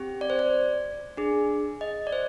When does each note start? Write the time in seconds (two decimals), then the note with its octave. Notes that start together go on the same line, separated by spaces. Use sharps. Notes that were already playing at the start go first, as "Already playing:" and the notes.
Already playing: C4 G4
0.21 D5
0.30 C5
0.39 D5
1.17 D4 G#4
1.81 D#5
2.07 D5
2.13 C5